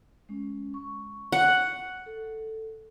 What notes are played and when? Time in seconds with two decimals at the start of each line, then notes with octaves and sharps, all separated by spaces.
0.29 G#3 C#4
0.74 C#6
1.32 F#5
2.06 A4